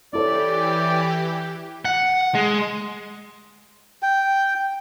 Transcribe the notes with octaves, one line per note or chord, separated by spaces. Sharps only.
E3 E4 G4 A4 C#5 D5
F#5
G#3
G5